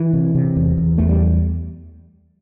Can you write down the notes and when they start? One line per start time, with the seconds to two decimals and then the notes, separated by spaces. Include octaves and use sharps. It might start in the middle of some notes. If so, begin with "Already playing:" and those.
Already playing: E3
0.13 C3
0.35 C3
0.56 E2
0.78 E2
0.98 E2 A3
1.09 G3